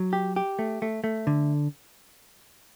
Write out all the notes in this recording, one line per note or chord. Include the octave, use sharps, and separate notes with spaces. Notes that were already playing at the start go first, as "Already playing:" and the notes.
Already playing: F#3
G4
G4
A3
A3
A3
D3